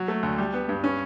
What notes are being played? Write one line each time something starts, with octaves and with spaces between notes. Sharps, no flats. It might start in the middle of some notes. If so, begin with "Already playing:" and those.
Already playing: F#3
A3
D2
G3
B3
G2
C#4